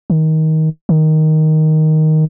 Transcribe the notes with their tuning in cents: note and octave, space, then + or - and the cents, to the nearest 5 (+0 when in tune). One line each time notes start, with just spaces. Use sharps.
D#3 +20
D#3 +5